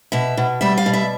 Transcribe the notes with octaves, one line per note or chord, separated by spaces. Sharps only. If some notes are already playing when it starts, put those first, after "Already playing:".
B2 E5
B2
G3 E5
F5
B2
E5